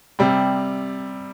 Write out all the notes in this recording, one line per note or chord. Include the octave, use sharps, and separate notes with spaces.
C3 G3 C4